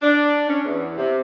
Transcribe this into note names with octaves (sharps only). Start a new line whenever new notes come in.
D4
C#4
E2
C3